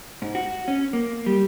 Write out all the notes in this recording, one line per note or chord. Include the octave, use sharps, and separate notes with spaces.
G#2
F#4
C#4
A#3
G3